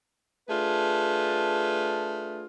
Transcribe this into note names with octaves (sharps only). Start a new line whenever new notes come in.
A3 D4 F4 G#4 B4